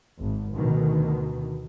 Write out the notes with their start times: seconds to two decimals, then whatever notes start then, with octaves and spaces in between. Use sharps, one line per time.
0.19 G#1
0.55 D2 B2 D3 D#3